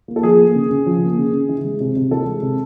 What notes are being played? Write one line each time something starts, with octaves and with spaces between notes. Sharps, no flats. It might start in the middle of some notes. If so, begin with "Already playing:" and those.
A#3
A4
F3 G#4
A#3
C#3
C#3
F3
A#3
C#3
C#3
E3
G#3
C3
C3
E3 A4
G#3
C3